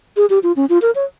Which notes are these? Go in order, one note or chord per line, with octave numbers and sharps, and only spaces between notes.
G#4
G4
F4
C#4
F4
A#4
C#5